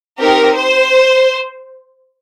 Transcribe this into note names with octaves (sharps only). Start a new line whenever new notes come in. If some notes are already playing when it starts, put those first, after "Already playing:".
C4 D#4 G4 A#4
C5